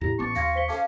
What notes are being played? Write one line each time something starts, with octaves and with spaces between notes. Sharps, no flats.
E2 A2 C3 E4 G4 A#5
A1 B3 A5 C#6 D6 A6
D#2 F5 C6 G#6 A#6
C5 B6 G7
C#4 A4 F5 A5 D6